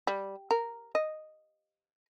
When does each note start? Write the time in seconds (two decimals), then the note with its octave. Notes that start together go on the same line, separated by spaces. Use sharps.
0.07 G3
0.51 A#4
0.95 D#5